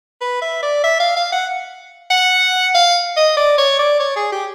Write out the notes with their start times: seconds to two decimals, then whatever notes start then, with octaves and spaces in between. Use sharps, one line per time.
0.21 B4
0.42 E5
0.63 D5
0.84 E5
1.00 F5
1.16 F5
1.32 F#5
2.10 F#5
2.75 F5
3.17 D#5
3.37 D5
3.58 C#5
3.79 D5
4.00 C#5
4.16 G#4
4.32 G4